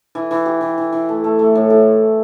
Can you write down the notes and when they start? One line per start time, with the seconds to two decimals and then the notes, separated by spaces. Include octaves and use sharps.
0.15 E3
0.31 E3
0.46 G4
0.61 E3
0.78 E3
0.93 E3
1.09 A3
1.24 A3
1.39 A3
1.55 A2
1.70 A2